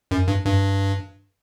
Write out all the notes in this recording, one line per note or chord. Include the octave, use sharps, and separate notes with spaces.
F#2
G2
G2